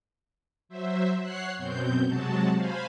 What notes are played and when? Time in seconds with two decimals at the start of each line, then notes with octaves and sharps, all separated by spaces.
0.69 F#3 C5 E5
1.20 C#5 F#5 F#6 C7
1.56 F#2 B2 C4 G6
2.05 C3 F#3 G#3 F#4 A5
2.55 C5 F5 G#5 B5